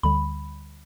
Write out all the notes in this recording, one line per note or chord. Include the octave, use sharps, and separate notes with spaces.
D2 D3 G3 B5